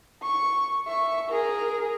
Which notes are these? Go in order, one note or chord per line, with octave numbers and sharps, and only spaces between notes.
C#6
E5 C#6
G#4 A#4